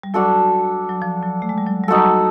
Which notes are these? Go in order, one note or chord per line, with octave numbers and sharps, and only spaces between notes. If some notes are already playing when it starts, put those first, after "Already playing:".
G3
F#3 D4 F#4 A4
F#3
F3
F#3
A3
G#3
G3
F#3
G3
F#3 D#4 F#4 A4